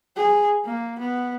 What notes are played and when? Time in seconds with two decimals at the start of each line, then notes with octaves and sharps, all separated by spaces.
0.16 G#4
0.65 A#3
0.99 B3